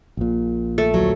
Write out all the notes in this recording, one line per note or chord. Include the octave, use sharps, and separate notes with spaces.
A#1 A#2
A3
D2 F#3